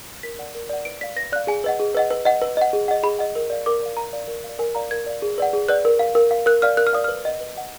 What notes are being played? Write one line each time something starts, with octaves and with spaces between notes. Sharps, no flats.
A#4 B6
D5 F#5
A#4
D5 F#5
B4 D7
D5 F5 B6
B4 A#6
D5 F5 F#6
G#4 G#5
B4 D#5 F#5
G#4
B4 D#5 F#5
B4
D#5 F#5
B4
D#5 F#5
G#4
D#5 F#5
G#4 B5
D#5 F#5
A#4
D5 F5
A#4 D6
D5 F5
A#4 A#5
D5 F5
A#4
D5 F5
A#4 G#5
D5 F5 A#5
A#4 G#6
D5 F5
G#4
B4 D5 F#5
G#4
B4 D5 F#5 F#6
A#4
F5
A#4
F5
A#4 F#6
D5 F5 F6
A#4 F#6
F6
D5 F5 D#6
B4 F6
D#5 F#5
B4
D#5 F#5